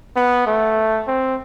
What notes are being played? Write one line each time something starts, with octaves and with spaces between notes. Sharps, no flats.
B3
A3
C4